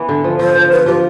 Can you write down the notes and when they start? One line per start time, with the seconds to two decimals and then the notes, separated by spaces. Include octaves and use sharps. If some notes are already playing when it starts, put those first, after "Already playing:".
Already playing: E3 B3
0.09 D3
0.24 F3
0.39 F3 C5
0.56 F3
0.70 F4 B4
0.86 F3 G4